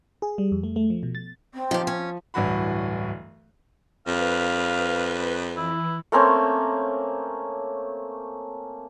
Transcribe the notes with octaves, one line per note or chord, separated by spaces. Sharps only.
G#4
G3
F2
A3
A3
F3
B2
A6
C4
D#3 F3 G4
C#4
D1 G2 E3 F#4 B5
F2 B4 F5
E3 E4
A3 A#3 C4 C#4